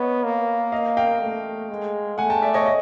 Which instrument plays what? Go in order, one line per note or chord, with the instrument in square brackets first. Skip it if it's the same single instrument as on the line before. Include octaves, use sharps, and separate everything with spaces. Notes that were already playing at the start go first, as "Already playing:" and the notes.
Already playing: [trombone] B3 [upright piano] C#5 D#5
[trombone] A#3
[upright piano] D#5 F5
F5 G5
[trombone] A3
G#3
[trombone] A3 [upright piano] F#5 G#5
[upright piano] G5 A5
D5 E5
C#5 D#5
D#5